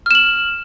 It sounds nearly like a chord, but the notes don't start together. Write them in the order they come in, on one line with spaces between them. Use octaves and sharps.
F6 E7 F#7